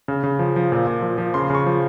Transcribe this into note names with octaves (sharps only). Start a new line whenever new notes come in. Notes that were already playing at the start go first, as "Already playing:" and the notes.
C#3
C#3
F3
F3
A#2
A#2
F3
F3
C#3 C6
C6
C#3 C#6
F3